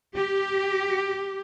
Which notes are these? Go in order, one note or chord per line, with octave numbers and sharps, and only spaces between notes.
G4